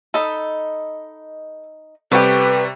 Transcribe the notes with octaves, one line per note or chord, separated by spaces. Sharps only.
D#4 A4 D#5 B5
C3 G3 A3 B3 G4 B4 C#6